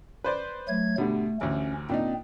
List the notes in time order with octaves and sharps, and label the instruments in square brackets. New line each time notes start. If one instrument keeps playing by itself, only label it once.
[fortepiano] B4 C5 D5
[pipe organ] F#3 A3 G#6
[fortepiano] B2 D3 G3 [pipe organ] A3
[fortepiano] A1 D2 [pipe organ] C#4
[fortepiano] A#2 D4 D#4 [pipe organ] C4